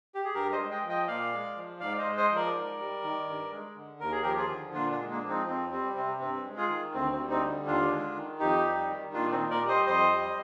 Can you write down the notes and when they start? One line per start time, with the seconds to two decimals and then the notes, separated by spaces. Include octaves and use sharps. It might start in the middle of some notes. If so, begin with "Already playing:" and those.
0.15 G4
0.24 G#4
0.34 G2 G4 A#4
0.52 C5 D#5
0.58 G#3
0.71 D#5 G5
0.82 F3
0.89 D#5 G5
1.07 A#2 D5 F5
1.32 G#3
1.56 F3
1.80 G#2 D5 F5
1.99 C5 D#5
2.05 G#3
2.17 C5 D#5
2.30 F3
2.35 A#4 D5
2.54 G#2
2.79 G3
3.03 D#3
3.27 G2
3.51 G#3
3.75 D3
4.00 D#2 A#4
4.11 G#4
4.23 F3 G4 A#4
4.37 F4 G#4
4.49 D3
4.73 A#2 D4 F4
4.91 D4 F4
4.98 G#3
5.11 A#3 D4
5.22 F3
5.29 C4 D#4
5.47 F2 C4
5.71 G3 C4
5.96 C3 C4
6.20 G2 C4
6.45 G#3
6.57 F4 G#4
6.69 D#3
6.93 D2 C4
7.12 C4
7.18 G3
7.30 C4 D#4
7.42 D3
7.67 D#2 D4 F4
7.91 G#3
8.16 D#3
8.40 F2 D#4 G4
8.65 G3
8.88 D#3
9.14 A#2 D4 F4
9.32 C4 D#4
9.37 A#2
9.50 A#4 D5
9.63 G3
9.68 C5 D#5
9.86 F2 C5 D#5
10.11 G3